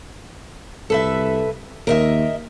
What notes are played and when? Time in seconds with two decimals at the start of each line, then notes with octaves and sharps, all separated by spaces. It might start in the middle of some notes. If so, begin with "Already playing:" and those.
0.90 C2 A4 B4 E5
1.87 D#2 A#4 D#5 E5